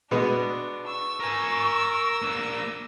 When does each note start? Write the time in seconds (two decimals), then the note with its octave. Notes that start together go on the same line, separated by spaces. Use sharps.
0.11 B2 G#3 B3 D4
0.87 C#6 E6
1.20 A#4 G#5
2.22 A#3 D4